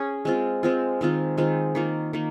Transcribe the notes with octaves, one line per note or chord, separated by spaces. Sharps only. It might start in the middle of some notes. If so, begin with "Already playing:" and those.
Already playing: C#4 G#4
G#3 C4 F4
G#3 C4 F4
D#3 G#3 C4 F4
D#3 G#3 C4 F4
D#3 A#3 F4
D#3 A#3